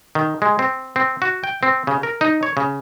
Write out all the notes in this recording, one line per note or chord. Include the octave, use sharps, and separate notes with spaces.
D#3
G#3
C4
C4
F#4
G5
C4
C#3
A#4
D#4
C#5
C#3